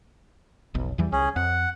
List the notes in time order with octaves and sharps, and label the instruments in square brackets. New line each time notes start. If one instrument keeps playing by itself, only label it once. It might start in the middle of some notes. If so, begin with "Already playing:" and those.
[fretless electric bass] F1 B1
E2 E3 G3
[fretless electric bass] C2 [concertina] C#4 G#4
[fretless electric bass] F2 [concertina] F#5